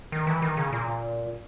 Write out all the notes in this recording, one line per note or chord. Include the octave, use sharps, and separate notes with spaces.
D#3
E3
D#3
C#3
A#2